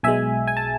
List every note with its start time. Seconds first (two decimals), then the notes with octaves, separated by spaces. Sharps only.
0.03 B1 B2 G#3 E5 G#5
0.47 G#5
0.57 A5